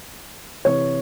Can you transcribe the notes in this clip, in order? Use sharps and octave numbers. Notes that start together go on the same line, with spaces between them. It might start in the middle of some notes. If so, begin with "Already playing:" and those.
C3 E3 C#5